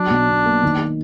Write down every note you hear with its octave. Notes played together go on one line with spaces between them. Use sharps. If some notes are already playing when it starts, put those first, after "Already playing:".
Already playing: F#3 D4
B1
B2
A#3
D#3